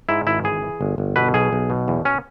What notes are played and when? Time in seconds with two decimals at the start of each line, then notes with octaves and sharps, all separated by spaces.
0.09 G#2 E4
0.27 G#1 E4
0.44 E3 G#4
0.62 E3
0.81 G1
0.98 G1
1.16 B2 B4
1.34 B1 G#4
1.53 B1
1.70 B2
1.88 E2
2.05 C#4